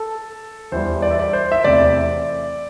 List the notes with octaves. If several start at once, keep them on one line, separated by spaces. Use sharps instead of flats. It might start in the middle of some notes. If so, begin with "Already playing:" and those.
Already playing: A4
E2 E3 G3 C5
D5
E5
D5
C5
E5
E2 C3 A3 C4 D5